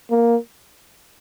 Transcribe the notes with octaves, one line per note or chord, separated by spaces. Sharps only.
A#3